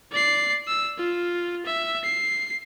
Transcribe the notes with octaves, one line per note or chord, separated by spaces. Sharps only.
D5 C7
E6
F4
E5
C7